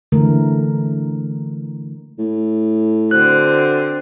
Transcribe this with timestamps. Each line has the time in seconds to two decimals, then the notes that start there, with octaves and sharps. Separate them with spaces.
0.12 D3 E3 A3 A#4
2.19 A2
3.11 D3 C4 F#4 A4 C5 F#6